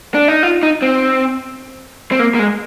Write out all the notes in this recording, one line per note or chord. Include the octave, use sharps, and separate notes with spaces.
D4
D#4
F4
D#4
C4
C4
A#3
A#3
G#3